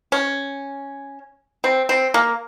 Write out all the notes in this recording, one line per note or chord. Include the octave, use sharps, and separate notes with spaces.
C#4
C4
C4
A#3